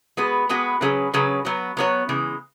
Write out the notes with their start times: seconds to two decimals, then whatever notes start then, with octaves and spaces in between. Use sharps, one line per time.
0.17 G#3 B3 F#4 B4
0.49 G#3 B3 F#4 B4
0.81 C#3 F#3 C#4 G#4 B4
1.14 C#3 F#3 C#4 G#4 B4
1.45 F#3 B3 F#4 C#5
1.77 F#3 B3 F#4 C#5
2.09 C#3 E3 G#3